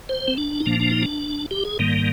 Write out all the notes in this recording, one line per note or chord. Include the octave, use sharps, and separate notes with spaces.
C5
C4
D4
D#4
A#2 F3 A#3 D4
D4
D#4
D4
G4
G#4
G#2 D#3 G3 A#3